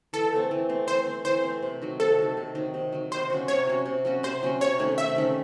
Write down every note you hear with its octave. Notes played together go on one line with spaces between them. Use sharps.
E3 A4
A3 C4
E3
A3 C4
E3 C5
A3 C4
E3 C5
A3 C4
C3
D#3 F#3
C3 A4
D#3 F#3
C3
D#3 F#3
C3
D#3 F#3
C3 C5
F#3 C#4 F#4
C3 C#5
F#3 C#4 F#4
C3
F#3 C#4 F#4
C3 C5
F#3 C#4 F#4
C3 C#5
D#3 A3 C#4
C3 E5
D#3 A3 C#4